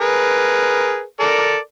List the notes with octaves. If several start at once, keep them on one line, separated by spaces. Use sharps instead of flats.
G#4 A#4 B4
A4 A#4 D5